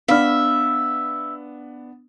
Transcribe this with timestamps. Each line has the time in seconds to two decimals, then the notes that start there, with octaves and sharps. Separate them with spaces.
0.08 B3 D4 E5 F5 B5 F6